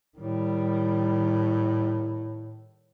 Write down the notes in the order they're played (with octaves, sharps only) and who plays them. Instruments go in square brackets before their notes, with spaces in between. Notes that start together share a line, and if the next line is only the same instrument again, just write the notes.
[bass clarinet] A2 [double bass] D#3 G3